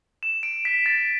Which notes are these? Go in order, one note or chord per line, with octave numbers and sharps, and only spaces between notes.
E7
D7
B6
A6